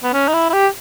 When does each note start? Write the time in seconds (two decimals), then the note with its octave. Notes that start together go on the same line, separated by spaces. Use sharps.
0.03 B3
0.13 C#4
0.28 D#4
0.34 E4
0.50 E4
0.53 G4